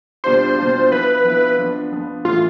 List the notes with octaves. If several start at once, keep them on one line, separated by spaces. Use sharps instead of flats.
B2 G3 D4 F4 C5
B2 G3 D4 F4
F3 B3 E4 B4
F3 B3 E4
F3 B3 D4
F3 B3 D4
A2 E3 A3 F4